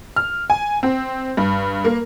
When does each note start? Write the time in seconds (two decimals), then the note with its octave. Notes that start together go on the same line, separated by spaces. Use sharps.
0.16 F6
0.50 G#5
0.83 C4
1.37 G2
1.85 A#3